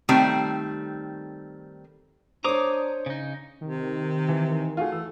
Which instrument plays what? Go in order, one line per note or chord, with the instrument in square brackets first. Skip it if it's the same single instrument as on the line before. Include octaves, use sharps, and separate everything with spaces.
[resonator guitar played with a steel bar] D#3 G3 A3 C4
[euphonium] D4 [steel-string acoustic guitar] C5 C#5 [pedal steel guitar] A#5 D6 D#6
[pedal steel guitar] C#3 D#4
[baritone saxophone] C3 [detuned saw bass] D#3
[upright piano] E3
[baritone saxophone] A3 [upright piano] F4 F#4 G#4
[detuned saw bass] E3 [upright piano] E6